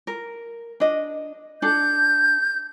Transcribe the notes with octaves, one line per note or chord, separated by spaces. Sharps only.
A#4
D4 D#5
D4 A4 G6